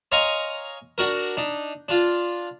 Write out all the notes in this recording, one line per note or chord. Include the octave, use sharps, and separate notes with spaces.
C#5 D#5 F5 G#5 A#5 C6
D4 F#4 A#4
D4 D#4
D4 F4